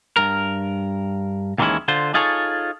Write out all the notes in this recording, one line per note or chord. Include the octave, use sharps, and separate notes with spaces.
G2 A#4
D#2 D#3 E3 G#3 C#4 E4
D3 F4 C5
D#4 F4 G#4 A4 C#5